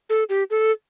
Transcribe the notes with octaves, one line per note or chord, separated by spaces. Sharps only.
A4
G4
A4